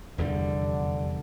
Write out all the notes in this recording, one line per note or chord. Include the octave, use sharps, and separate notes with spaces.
F1 E2 D3 G3